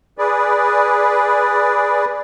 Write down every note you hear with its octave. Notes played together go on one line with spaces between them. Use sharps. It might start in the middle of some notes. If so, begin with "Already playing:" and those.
G#4 B4 D5